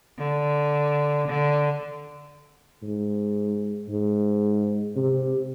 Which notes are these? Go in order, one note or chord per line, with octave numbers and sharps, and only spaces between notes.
D3
D3
G#2
G#2
C3